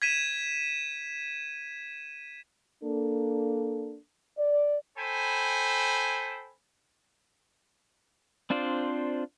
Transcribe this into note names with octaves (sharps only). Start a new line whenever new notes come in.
G#6 B6 D#7 E7
A#3 D4 A4
D5
A4 C5 G5 G#5 B5
C4 D4 F4 C5 D5